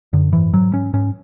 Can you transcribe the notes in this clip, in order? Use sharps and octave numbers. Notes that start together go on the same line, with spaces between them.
F#2 D3
G#2 E3
G#2 F#3
G#2 C#4
G#2 C#4